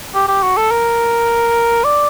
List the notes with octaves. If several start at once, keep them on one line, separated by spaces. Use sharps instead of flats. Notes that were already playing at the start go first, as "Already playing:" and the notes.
G4
G4
F#4
A4
A#4
D5